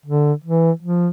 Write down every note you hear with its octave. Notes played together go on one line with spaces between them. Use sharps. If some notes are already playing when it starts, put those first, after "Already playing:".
D3
E3
F3